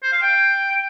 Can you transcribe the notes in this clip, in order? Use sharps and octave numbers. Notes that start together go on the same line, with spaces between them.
C5
F5
G5